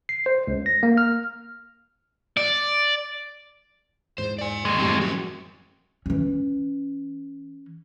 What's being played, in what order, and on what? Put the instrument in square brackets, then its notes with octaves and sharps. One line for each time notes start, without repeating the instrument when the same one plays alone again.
[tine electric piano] C7
C5
C#2
A#6
A#3
F6
[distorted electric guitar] D5
[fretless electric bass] E2 G#2 [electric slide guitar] C5
[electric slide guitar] D5 G#5
[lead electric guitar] D#2 G#3
[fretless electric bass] F#2 A2 G3 [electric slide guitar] C4 E4 G4
[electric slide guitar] F3 C#4 F#4
[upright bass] E3 C#4